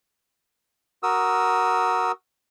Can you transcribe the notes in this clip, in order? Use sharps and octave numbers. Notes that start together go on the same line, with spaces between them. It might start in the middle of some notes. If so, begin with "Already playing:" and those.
F#4 A#4 D#6 E6